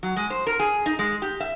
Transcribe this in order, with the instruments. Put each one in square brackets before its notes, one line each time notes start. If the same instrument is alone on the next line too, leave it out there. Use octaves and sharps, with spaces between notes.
[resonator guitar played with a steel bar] F#3
G#3
C5
A#4
G#4
D#4
G#3
G4
E5